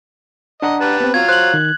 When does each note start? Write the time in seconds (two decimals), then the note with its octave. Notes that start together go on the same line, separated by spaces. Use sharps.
0.62 D4 D#5 F#5 A#5
0.81 G4 B4 A5
1.00 B3 C4
1.14 F#3 F4 G#6
1.29 C5 F#6 F#7
1.54 D#3